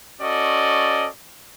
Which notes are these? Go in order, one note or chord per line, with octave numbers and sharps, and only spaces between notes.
C#4 F#4 A4 D5 D#5